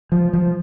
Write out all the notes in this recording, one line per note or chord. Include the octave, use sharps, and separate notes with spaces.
F3
F3